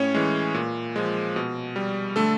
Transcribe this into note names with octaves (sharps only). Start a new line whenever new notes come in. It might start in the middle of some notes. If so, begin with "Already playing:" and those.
Already playing: A2 C#4 C#5
E3 G#3
A#2
F3 G#3
B2
G3
D3 A3 A4